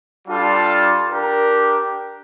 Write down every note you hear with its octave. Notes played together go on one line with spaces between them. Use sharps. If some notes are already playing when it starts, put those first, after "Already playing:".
G3 D4 F4 A4
D4 G4 A#4